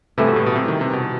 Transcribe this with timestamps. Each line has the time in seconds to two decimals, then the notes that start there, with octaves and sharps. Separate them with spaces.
0.18 G2 C3 E3 A3 E4
0.27 B2
0.36 A2
0.46 B2
0.56 C3
0.68 D#3
0.81 C3
0.93 B2